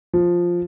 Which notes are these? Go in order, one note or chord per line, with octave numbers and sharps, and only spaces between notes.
F3